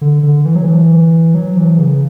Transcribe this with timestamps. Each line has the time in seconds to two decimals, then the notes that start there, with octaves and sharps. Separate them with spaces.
0.01 D3
0.23 D3
0.45 E3
0.55 F#3
0.64 E3
1.34 F#3
1.57 E3
1.78 C#3